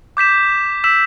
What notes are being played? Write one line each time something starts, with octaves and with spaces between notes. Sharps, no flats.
D6 G6 B6 E7
E6 B6 E7